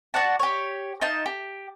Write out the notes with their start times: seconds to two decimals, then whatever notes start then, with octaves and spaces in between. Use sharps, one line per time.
0.14 F#4 D5 F#5 A5
0.39 G4 C#5
1.01 D#4 F4 A5
1.26 G4